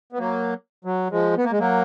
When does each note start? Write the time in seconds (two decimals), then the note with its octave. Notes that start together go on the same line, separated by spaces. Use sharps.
0.13 B3
0.18 F#3 A#3
0.85 F#3
1.11 F3 G#3
1.37 B3
1.44 A#3
1.52 G#3
1.59 F#3 A#3